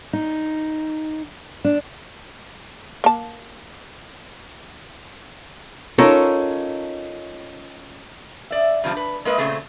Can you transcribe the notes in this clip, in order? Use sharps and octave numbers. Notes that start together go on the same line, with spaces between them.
D#4
D4
A#3 A5
C#4 D#4 F4 A4 A#4 C#5
D5 E5
G2 C3 F3 D5 A5
B4
G#3 A#3 B4 D#5 E5
A#2 C#3 A3 C4 G#4